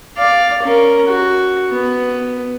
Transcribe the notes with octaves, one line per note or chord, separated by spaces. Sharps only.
D5 F5
C#4 A#4
F#4
B3 B4